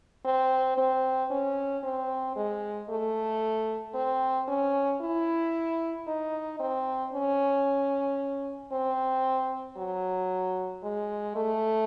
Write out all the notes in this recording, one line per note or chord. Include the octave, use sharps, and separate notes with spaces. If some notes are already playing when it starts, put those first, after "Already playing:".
C4
C4
C#4
C4
G#3
A3
C4
C#4
E4
D#4
C4
C#4
C4
F#3
G#3
A3